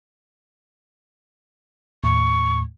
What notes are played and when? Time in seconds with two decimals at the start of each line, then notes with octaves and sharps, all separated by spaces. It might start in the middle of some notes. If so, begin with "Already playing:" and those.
2.04 D#2 A2 C#6